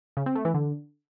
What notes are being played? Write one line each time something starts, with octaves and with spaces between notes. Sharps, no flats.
C#3
C4
A3
E3
D3